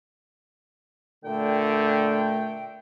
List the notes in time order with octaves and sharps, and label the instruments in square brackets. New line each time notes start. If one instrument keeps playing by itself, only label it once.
[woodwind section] A#2 A3 G5 [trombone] D3